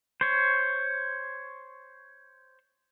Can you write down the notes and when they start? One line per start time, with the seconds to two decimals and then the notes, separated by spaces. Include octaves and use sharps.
0.21 C5 C#5